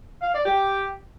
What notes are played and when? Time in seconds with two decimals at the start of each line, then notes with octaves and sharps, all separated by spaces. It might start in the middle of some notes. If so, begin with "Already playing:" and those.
0.22 F5
0.34 D5
0.45 G4